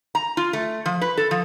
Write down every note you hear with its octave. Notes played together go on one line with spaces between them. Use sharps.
A#5
F4
A3
F3
B4
A4
F3